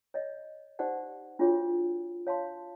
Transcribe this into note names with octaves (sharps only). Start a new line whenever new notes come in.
C#5 D#5 E5
D#4 G4 C5 D5 F#5
D4 F4 F#4 G#4 C#5
C#5 F5 A5 C6